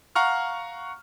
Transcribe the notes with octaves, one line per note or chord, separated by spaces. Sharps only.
F5 F#5 A#5 C#6 F6